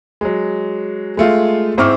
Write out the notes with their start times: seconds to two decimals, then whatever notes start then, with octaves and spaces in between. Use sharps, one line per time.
0.21 F#3 G#3
1.17 G#3 A3 F4
1.78 G#2 C4 E4 C#6 D6 F6